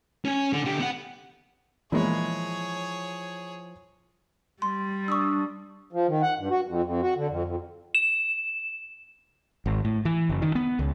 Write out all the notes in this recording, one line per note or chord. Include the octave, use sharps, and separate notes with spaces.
C#4 G#5
D3
D3 G4
B3 F#5
A#2 E3 F3 G#3 B3 E4 G#4 C#5
G3 C6
D4 C#6 D#6 E6
F3
D#3
F#5
G2
F#4
F2
F2
F#4
D3
F2
F2
E7
G#1
A2
E3
F#1
D#3
B3
C#2